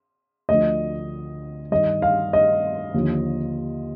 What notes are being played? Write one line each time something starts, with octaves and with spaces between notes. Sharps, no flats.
D2 D3 F3 D#5
G2 D#3 D#5
F5
D#5
D#2 D3 F3